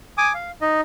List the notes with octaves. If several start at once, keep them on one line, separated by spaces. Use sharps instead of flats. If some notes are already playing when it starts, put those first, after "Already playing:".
G#5 D6 D#6
F5
D#4 D#5